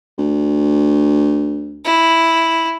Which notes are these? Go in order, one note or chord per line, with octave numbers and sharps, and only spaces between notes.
D2
E4